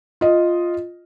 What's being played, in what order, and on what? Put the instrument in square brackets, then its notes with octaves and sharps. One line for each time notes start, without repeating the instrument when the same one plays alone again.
[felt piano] F4 D#5